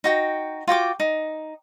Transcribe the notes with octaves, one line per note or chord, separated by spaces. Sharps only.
D#4 F#4 G5
F4 F#4 G5 D6
D#4